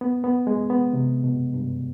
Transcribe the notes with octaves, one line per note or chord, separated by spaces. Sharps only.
B3
B3
G#3
B3
C3
B2
G2